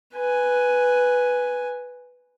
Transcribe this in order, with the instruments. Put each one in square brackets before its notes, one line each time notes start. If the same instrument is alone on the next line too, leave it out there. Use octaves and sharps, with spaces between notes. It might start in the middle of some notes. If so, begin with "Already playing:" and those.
[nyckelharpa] B4 G#5